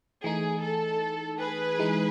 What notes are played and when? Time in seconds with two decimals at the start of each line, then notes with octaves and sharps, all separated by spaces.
0.24 E3 A3 D#4 G#4
0.62 A4
1.39 G#4 B4
1.79 E3 G#3 D#4